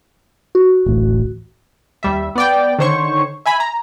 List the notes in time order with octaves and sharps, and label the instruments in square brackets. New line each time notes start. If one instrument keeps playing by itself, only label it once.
[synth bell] F#4
[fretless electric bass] D1 A1
[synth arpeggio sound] D#2 G3 E5
B3 D5 G5
D3 D#3 C5 C#5 C#6
E5 G#5 B5
A#5